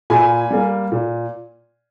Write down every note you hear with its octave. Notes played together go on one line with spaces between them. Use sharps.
A#2 G#5 B5
G3 A#3
A#2